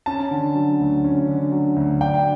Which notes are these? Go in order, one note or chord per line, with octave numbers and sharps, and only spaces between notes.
C#4 A5
D3
F#3
D2
C#4
D3
F#3
D2
D4 G5